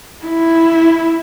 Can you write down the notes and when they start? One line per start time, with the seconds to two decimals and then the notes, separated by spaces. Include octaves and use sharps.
0.24 E4